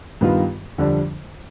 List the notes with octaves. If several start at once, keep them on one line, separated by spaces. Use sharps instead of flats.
G2 D#3 B3 F4
F2 D3 G3 D4